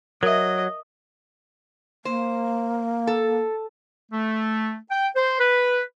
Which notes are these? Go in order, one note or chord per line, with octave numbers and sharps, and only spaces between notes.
F#3 A#4 D#5 E5
A#3 C5
A4
A3
G5
C5
B4